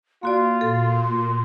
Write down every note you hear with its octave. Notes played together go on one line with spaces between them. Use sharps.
A#3 F4 F#4 D5 C6
A#2 A4